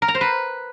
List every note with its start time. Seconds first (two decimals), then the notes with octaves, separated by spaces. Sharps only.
0.02 A#4
0.08 A#5
0.15 C5
0.21 B4